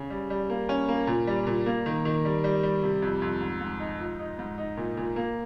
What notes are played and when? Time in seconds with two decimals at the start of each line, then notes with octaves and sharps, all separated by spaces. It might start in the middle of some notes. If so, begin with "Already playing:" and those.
Already playing: C#3
0.10 G3
0.30 G3
0.50 A#3
0.69 C#4
0.89 A#3
1.07 A#2
1.27 G3
1.47 A#2
1.66 A#3
1.86 D#3
2.05 D#3
2.25 G3
2.44 G3
2.63 G3
2.83 C3
3.02 F2
3.22 F2
3.41 G#2
3.61 G#2
3.80 D#4
4.00 F3
4.19 D#4
4.39 G#2
4.58 D#4
4.77 A#2
4.97 A#2
5.16 A#3